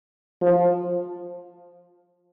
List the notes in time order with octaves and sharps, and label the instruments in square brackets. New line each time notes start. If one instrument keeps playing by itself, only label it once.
[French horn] F3